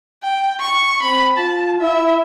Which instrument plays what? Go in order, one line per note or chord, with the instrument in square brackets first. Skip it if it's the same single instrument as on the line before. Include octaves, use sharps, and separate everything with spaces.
[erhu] G5
C#6
[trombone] C4 [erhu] B5
[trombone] F4 [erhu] A5
[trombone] E4 [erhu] E5